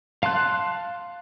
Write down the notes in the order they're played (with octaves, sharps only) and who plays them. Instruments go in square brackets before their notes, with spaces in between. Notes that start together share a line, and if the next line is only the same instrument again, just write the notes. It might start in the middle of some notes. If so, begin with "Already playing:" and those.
[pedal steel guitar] F5 A5 C6 F#6